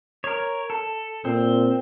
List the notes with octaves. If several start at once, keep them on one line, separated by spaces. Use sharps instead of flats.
A#4 C#5
A4
A#2 C4